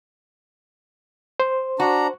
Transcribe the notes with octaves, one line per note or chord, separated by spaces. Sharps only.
C5
D4 F#4 A#5